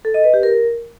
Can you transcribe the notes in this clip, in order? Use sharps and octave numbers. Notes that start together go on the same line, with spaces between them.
A4
D#5
B4
G4
A#4